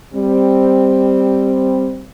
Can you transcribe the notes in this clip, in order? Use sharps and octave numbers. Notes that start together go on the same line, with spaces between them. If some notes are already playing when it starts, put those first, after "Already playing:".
G3 C4